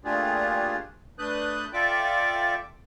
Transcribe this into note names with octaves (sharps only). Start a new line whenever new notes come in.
A#2 A3 D4 F4 G4 G#4
A3 D4 B4 D#6 F#6 G6
F4 A4 D5 E5 G5 D6